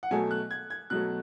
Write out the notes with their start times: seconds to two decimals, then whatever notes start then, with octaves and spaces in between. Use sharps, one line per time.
0.03 F#5
0.11 B2 F#3 A3 G#5
0.31 F#6
0.51 G#6
0.70 G#6
0.90 B2 F#3 A3 F#6